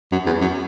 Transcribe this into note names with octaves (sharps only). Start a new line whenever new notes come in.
F#2
E2
F#2